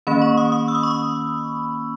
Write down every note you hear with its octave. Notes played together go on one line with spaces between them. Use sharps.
D#3 A#3 C#4 B5
C#6
D#6
D#6
E6
D#6
C#6
D#6